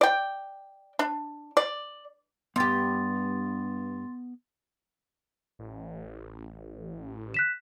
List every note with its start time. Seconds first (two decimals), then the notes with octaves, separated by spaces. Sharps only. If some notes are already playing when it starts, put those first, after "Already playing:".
0.01 D5 G5
0.99 D4
1.57 D5
2.56 G2 B3 G4 C6 A6
5.59 A1
7.34 F#6 B6 E7